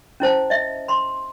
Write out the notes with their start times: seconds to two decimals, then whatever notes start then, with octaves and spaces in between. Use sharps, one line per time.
0.20 C#4 E4 C5 A5
0.50 D#5 E5
0.88 B5 C6